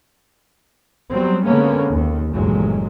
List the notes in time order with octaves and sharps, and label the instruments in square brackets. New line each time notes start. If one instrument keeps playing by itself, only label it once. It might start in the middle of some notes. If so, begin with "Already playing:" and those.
[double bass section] F#3 G3 B3 C4
D3 G#3 A#3 B3 C#4
D#2
G1 E2 A#2 F#3 G#3